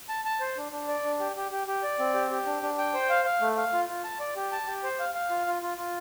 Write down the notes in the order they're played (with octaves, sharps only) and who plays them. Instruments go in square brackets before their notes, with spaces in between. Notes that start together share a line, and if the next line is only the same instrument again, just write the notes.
[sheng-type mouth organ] A5
A5
C5
D4
D4
D5
D4
G4
G4
G4
G4
D5
C4
G4
G4
D4
D4
G5
C5
F5
F5
A3
F5
F4
F4
A5
D5
G4
A5
G4
C5
F5
F5
F4
F4
F4
F4